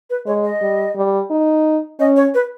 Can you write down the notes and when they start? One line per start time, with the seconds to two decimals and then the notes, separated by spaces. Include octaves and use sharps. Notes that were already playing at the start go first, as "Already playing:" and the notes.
0.10 B4
0.26 G#3 C#5
0.44 D#5
0.61 G3
0.96 G3
1.30 D#4
2.00 C#4 D#5
2.16 C#5
2.34 B4